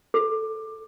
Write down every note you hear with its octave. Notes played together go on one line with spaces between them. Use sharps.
A4